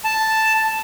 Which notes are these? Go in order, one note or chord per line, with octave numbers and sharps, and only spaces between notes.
A5